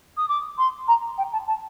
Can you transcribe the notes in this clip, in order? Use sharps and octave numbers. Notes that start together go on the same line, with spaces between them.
D#6
D6
C6
A#5
G5
A5
A5